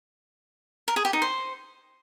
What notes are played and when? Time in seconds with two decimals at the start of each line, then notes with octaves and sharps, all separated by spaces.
0.88 A#4
0.96 G#4
1.05 G4
1.13 D#4
1.22 C5